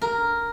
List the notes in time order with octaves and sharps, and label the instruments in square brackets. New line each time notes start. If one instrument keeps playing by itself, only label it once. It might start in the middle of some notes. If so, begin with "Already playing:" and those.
[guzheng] A#4